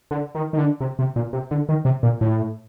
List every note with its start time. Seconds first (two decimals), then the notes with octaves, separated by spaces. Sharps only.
0.11 D3
0.35 D#3
0.53 D#3
0.58 D3
0.81 C3
0.99 C3
1.16 A#2
1.33 C3
1.51 D3
1.69 D#3
1.85 C3
2.03 A#2
2.21 A2